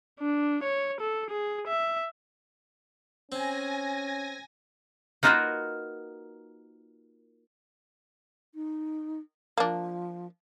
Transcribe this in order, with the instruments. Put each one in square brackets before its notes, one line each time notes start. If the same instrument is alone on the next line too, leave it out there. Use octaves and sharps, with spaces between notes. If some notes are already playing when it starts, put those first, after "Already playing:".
[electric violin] D4
C#5
A4
G#4
E5
[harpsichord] C4 [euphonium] C#4 [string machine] G#5 A#6
[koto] A#3 D#4 F4 F#4 A#4 B4
[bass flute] D#4
[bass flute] F3 [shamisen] A#3 D4